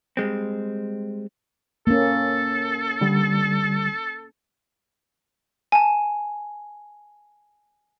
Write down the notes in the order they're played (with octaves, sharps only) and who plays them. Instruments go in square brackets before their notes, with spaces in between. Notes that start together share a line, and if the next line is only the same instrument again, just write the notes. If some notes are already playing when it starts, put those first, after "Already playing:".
[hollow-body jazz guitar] G3 G#3 C4
[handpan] A#3 C#4 [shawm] A4
[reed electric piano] D3 G3
[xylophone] G#5 A5